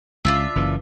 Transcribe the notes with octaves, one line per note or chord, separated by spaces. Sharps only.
C#2 D4 F4 E5
F#1 F#2 E3